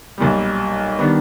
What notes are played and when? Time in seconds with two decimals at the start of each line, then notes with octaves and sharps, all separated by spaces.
0.18 B1 A#2 G3
0.99 D#3 G3 B3 D4